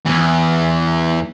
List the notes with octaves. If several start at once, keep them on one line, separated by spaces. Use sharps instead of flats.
E2 E3